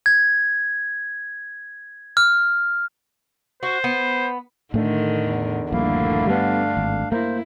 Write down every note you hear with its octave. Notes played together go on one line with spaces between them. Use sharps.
G#6
F6
F#4 C5
B3
A2 D3 D#3 A3 D4
E2
D#1 A#1 G2 D3 A3 A#3 E4 F5
G3 B3 D4 F5
G#1
A#3 E4 C5